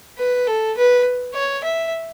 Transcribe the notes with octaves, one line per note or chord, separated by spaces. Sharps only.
B4
A4
B4
C#5
E5